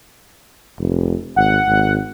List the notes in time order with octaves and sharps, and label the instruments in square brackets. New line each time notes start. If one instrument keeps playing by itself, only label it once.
[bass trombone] F1
[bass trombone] G#1 [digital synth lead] F#5
[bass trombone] G#1